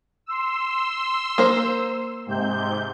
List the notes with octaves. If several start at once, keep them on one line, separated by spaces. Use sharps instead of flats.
C6 E6
A#3 C5
G#2 C3 G6